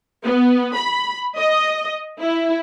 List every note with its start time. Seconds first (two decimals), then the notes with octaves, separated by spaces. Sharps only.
0.25 B3
0.76 B5
1.38 D#5
2.20 E4